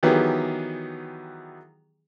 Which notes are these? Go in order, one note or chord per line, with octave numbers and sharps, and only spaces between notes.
D#3 E3 F#3 B3 G4 G#4